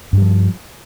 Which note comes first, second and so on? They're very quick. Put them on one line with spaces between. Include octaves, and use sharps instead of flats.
G2 G3 F3